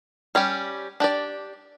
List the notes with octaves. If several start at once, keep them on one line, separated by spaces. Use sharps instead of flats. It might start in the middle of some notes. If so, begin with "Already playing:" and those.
G3 C#4 G4
D4 G4 D5